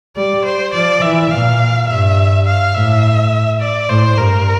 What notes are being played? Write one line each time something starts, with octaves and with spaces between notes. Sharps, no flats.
G3 D5
C5
F3 D5
E3 E5
A#2 F5
G2 E5
F5
A2 E5
D5
A2 C5
G2 A#4